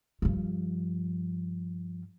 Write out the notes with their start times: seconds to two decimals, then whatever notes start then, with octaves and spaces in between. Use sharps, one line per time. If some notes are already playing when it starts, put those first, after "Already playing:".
0.22 G2 F3